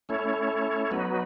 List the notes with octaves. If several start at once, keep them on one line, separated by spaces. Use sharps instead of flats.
A3 C#4 E4 A4 C#5
F#3 B3 D#4 F#4 B4